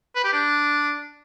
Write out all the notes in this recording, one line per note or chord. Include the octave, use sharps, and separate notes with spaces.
B4
G4
D4